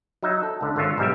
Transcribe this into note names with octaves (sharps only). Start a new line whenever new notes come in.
F#3 D#4 E5
A4
C#2 D3
G#1 D3 F4 C#5 E5
B1 G#2 G3 G4 E5